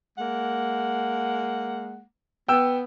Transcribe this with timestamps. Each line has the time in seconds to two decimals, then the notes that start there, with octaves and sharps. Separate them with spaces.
0.17 G#3 A#3 F#5
2.48 B3 G5 E6